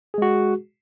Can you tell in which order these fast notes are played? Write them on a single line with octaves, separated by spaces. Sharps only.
G#4 G#3 F#4